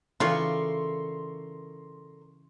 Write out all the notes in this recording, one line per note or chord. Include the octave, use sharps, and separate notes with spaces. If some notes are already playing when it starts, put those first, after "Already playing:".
C#3 E3 F4 A4 A#4 D5 C6 C#6